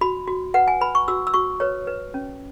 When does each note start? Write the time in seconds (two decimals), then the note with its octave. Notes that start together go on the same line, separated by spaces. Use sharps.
0.01 F#4 B5
0.27 F#4
0.54 B4 F#5
0.68 G#5
0.81 B4 B5
0.95 C#6
1.08 F#4 E6
1.27 E6
1.34 F#4 C#6
1.60 B4 C#5
1.87 B4
2.14 C#4